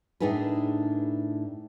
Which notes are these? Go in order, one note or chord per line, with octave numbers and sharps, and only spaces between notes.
A2 D4 D#4 G#4 A#4 B4